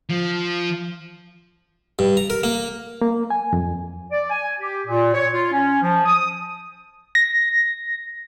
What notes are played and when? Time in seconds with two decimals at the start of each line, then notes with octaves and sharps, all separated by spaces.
0.09 F3
1.99 G2
2.17 A#5
2.30 A#4
2.43 A#3
3.01 A#3
3.30 G#5
3.53 F2
4.10 D5
4.30 G#5
4.60 G4
4.87 A#2
5.13 C#5
5.33 F4
5.51 C#4
5.81 F3
6.06 D#6
7.15 A#6